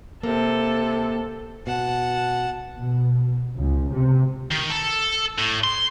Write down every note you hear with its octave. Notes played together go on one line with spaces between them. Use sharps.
C3 A#3 A4
B2 F#5 A5
B2
C#2
C3
D#3
A4
A2
C6